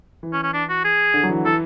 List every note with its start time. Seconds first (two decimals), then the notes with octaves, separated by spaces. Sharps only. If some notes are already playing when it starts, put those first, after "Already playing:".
0.23 E3
0.33 C#4
0.43 C#4
0.53 D4
0.69 F#4
0.84 G#4
1.14 D3
1.23 F#3
1.29 E3
1.45 E3 A4